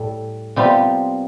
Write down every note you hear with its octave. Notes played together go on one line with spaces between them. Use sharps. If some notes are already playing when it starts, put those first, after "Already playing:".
Already playing: A2 G3 A4
C3 G3 B3 F4